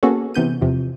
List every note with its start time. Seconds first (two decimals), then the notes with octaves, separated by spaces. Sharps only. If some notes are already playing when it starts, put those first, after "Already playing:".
0.03 A#3 B3 C#4 F#4 G#4 A4
0.34 C3 E3 B3 G6 D#7
0.61 E2 C3 F3